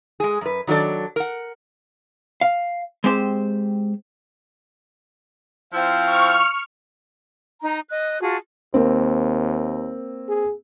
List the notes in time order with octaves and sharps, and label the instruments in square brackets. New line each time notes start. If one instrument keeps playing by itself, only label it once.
[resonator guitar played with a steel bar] G#3 G#4
F#2 B4
D#3 F#3 D4 A4 D5
A#4 F#5
[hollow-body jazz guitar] F5
G#3 C4 G4 C5
[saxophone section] F3 C4 E4 [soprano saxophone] F5
[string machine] C#6 F6
[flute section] D#4 A#5
D#5 F#6
F4 F#4 G#4 A5
[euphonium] D#2 [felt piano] A#3 C4
[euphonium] G#4